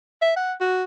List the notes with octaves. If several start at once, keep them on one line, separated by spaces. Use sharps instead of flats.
E5
F#5
F#4